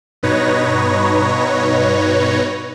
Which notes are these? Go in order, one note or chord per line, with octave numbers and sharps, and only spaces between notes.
G2 B2 D#4 B4 C#5 A#6